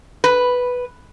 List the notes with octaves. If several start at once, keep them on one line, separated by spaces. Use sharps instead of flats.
B4